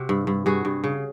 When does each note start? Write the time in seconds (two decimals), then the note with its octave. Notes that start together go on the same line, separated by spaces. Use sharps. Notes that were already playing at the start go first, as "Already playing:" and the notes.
Already playing: C3 F#4
0.09 G2
0.27 G2
0.46 G2 F#4 G#4
0.65 G2
0.84 C#3